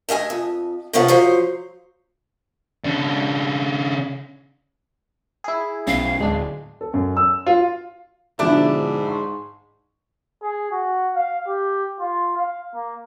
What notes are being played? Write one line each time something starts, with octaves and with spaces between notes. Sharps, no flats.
A3 D#5 F5 G#5
F2
C3 F3 B3 C#4 F4 F#5
F3 F#3 C5 C#5
C#3 D4
E4 G#4
B1 C#4 F5
D1 G#3 D4
A4
F#2
E6
F4
G#2 B2 D3 F3 D4 E4
C6 C#6
G#4
F#4
F5
G4
F4
F5
A#3